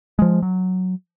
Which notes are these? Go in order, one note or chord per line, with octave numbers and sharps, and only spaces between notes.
F3 G#3
F#3